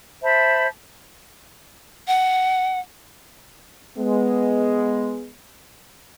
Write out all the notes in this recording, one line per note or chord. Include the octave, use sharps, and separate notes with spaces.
C5 E5 A5 B5
F#5
G#3 B3